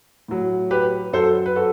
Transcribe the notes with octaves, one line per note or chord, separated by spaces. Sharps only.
A2 F#3
G4 B4
F#2 F#3 A4 C5
B4
F#4 A4